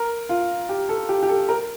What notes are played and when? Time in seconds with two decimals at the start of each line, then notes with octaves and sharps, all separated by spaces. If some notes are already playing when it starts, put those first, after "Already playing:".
Already playing: A#4
0.29 F4
0.69 G4
0.89 A4
1.09 G4
1.23 G4
1.29 A4
1.49 A#4